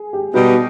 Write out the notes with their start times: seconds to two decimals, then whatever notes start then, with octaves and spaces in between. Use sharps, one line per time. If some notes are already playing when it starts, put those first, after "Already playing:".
Already playing: G#4
0.13 G4
0.34 B2 G3 B3 D#4 F#4